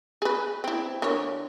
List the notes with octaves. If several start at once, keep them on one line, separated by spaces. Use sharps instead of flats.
G#4 B4
C4 E4
D3 A#4 C#5